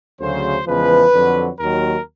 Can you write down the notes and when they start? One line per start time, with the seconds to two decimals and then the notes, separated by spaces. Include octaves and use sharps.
0.20 D2 C#3 F#3 C5
0.67 E2 C#3 F3 G#3 B4
1.13 F2 D3 F#3
1.59 D#2 D#3 F#3 A#4